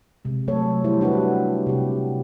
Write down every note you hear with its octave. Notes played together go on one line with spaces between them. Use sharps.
C3 G#3
F#3 A3 A4 C#5
G3 E4 C5
D4 F#4 G4 B4
C3 G4